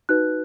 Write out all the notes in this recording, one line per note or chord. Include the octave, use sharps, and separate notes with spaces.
D#4 F#4 B4 F#6